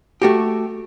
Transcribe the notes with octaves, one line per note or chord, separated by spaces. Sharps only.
A3 F#4 G4